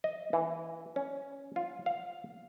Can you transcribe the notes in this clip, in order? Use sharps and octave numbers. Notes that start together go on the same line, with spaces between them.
D#5
E3
C#4
F4
F5